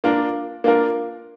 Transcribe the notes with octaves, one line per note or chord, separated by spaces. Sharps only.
A#3 D4 F4 A#4
A#3 D4 F4 A#4